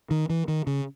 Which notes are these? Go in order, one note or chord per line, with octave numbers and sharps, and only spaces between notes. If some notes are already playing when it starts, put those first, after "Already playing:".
D#3
E3
D#3
C#3